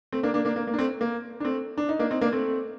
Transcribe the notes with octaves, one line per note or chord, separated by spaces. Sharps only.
A3 C4
A#3 D4
A#3 D4
A#3 D4
A#3
A#3
D4
A3 C4
A#3
D4
A3 C4
D4
D#4
A#3 D4
C4 D#4
A#3 D4
A3 C4